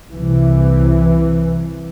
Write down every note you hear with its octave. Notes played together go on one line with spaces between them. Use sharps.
C2 C3 E3